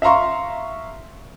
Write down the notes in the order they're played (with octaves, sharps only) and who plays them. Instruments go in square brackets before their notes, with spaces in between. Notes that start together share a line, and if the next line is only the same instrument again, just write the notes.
[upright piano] E5 F5 A#5 C6 C#6